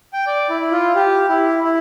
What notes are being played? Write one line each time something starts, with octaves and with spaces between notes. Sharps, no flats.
G5
D5
E4
E4
F4
G4
E4
E4